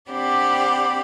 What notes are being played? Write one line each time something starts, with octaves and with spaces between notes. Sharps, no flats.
C4 D4 G4 D5 F#5 B5